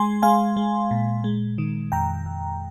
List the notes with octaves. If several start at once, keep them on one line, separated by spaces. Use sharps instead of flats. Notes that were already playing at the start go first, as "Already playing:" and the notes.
Already playing: G#3 G#5 C6
G#3 F5 G#5
G#3
A#2
G#3
D#3
F2 G5 A#5
F2